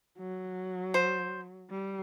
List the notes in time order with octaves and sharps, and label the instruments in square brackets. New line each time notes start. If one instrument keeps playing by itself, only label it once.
[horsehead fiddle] F#3
[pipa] C5
[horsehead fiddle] G3